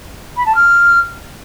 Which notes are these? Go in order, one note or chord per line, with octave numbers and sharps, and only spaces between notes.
B5
A5
F6